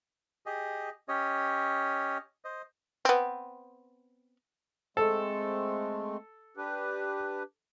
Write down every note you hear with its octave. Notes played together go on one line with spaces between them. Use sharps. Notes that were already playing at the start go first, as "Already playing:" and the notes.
G4 G#4 D#5
C#4 G4 C#5 D#5
C5 D#5
B3 C4
G#3 A3 C4 A4
D4 G4 B4